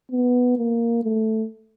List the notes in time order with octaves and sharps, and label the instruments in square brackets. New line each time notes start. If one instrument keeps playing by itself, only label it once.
[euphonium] B3
A#3
A3